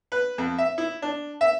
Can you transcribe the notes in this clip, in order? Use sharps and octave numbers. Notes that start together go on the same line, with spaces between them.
B4
F2
E5
E4
D4
E5